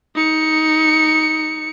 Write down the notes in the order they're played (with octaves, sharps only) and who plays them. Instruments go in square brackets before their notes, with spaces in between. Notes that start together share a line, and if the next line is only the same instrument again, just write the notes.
[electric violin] D#4 C#7